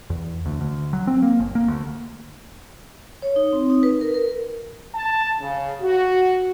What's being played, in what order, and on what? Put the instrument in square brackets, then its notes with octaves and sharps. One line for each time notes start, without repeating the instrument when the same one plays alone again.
[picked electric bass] E2
D2
D2
F#3
C4
A#3
G1
A#3
D2
[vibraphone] C#5
D#4
C4
D#4
B4
A#4
A#4
[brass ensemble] A5
C#3
F#4